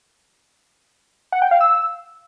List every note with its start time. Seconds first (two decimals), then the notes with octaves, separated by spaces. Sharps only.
1.32 F#5
1.42 G5
1.51 F5
1.61 E6